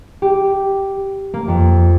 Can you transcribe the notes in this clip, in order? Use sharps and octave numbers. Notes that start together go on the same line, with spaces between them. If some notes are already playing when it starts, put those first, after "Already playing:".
G4
A#3
F2